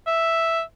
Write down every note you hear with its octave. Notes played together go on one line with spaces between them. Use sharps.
E5